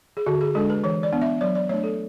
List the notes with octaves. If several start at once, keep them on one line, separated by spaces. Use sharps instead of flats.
G#4
D3 F#4
G#4
G#3 D4 A4
B4
E3 C#5
D5
B3 D4
E5
F#3 D5
D5
A3 D4 C#5
A4